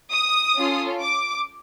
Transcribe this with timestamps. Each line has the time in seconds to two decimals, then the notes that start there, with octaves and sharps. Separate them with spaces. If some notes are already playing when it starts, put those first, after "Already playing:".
0.12 D#6
0.57 C#4 F4 A4
1.02 D6